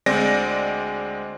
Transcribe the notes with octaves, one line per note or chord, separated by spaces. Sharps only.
D2 G#3 C4 D5 A#6